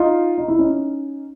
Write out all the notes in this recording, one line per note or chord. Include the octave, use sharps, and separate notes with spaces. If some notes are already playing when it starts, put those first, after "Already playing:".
Already playing: D#4 F4
D#4
E4
C#4 D#4